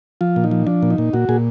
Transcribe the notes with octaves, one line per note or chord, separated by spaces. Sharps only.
F3 F4
A#2
D#4
F3
F3 D4
A#2
D#4
A#2
A#2 F#4
A#2 G#4